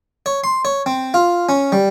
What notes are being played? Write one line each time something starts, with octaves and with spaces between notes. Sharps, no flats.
C#5
C6
C#5
C4
F4
C#4
G3